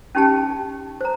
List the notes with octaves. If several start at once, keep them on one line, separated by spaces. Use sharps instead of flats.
C#4 D#4 G4 G5 A5
C5 A#5